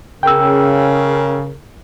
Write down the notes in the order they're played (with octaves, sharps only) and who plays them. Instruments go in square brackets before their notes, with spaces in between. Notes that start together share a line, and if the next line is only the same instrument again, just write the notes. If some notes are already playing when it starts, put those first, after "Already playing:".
[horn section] C#3 [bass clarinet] A#4 [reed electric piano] G5 E6